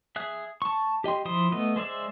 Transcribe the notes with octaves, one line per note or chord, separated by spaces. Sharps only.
G#4 E5 F#6
A5 C#6
G4 D#5 G5 C6
F3 E4 C6 D#6
A3 B3 D#5
G#3 C5 D5 E5